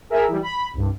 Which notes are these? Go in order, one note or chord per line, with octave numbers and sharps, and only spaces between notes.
G#4 A#4 E5
E3 G3
B5
C2 G2